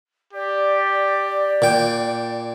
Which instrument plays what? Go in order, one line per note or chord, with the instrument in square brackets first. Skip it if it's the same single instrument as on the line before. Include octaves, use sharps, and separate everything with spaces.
[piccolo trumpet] G4 [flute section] D5
[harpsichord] A#2 G5